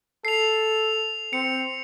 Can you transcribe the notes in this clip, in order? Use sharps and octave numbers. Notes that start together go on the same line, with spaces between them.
A4 C7 F7
C4 C#7